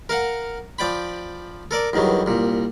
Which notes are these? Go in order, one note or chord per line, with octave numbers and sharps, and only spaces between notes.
A#4 F5 F#5
F3 D5 G5 B5
A4 A#4 D5
E2 G2 D#3 F#3
C2 A#2